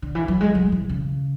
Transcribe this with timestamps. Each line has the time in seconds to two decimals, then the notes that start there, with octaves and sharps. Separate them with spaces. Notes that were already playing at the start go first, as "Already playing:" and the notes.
0.02 D3
0.15 E3
0.28 F#3
0.41 G#3
0.55 F#3
0.72 E3
0.89 C#3